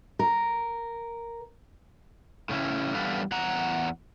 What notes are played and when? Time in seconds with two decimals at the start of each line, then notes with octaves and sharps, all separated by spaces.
0.19 A#4
2.49 A2 C#3 C#4 E4
2.95 E2 D3 G3 A4 B4 F5
3.32 E2 F#5 A#5